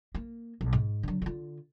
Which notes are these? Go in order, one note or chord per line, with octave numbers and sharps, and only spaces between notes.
A#3
B1
G#2
D3 F#3
D3 F4